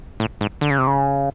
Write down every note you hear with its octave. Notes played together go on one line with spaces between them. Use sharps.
A2
G#2
D3
C#3
C3
C#3